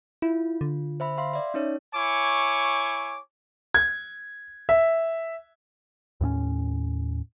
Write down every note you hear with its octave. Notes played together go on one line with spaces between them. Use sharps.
E4 F4
D3
C5 E5 B5
E5 F5 C6
D5 E5
C#4 D#4 C#5
E4 C#5 G#5 C#6 D6
G#6
E5
D#2 A2 B3 C#4